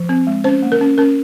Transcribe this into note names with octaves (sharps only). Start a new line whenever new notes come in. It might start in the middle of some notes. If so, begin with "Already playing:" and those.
Already playing: F3
C4
G#3
C#4 C5
A#3
A#4
C#4
C#4 A#4